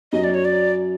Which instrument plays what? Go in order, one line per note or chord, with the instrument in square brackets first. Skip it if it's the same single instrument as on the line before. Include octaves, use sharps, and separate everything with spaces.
[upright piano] F#2 F#3 [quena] D#5
[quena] D5
C#5
D5